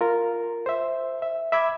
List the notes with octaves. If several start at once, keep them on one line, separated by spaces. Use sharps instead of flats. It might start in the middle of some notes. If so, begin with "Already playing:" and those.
F4 A#4
C5 E5
E5
E5 B5 D6 E6 G#6